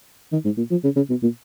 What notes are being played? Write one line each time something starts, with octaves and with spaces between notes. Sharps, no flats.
D#3
G#2
A#2
F3
C#3
C#3
B2
A#2